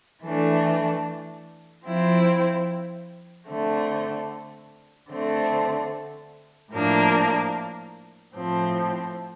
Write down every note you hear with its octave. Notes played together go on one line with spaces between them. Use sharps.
E3 A3 D4
F3 C4 E4
D3 A3 C4
D3 A3 C4
A2 F3 A#3 D4
A2 F3 C4